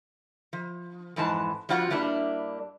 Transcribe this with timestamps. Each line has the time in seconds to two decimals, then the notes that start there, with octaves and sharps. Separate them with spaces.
0.53 F3
1.16 F2 G#2 E3 A5
1.69 F3 G3 C4 F4 F#4 F#5
1.90 G2 G3 A#3 D4 E4